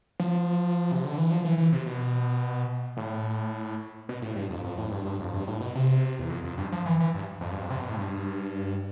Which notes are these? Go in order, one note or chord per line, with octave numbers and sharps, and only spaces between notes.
F3
C3
D3
E3
F3
E3
E3
C3
B2
A2
B2
A2
G2
F2
F2
A2
G2
G2
F2
G2
A2
B2
C3
E2
F2
F2
G2
F3
E3
E3
G2
F2
G2
F2
C3
B2
A2
G2